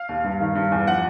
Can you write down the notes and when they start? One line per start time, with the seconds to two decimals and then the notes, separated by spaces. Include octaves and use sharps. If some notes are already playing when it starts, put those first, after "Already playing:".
Already playing: F5
0.09 D#2
0.24 G2
0.40 D#3
0.55 G2
0.72 E2
0.87 F3 F#5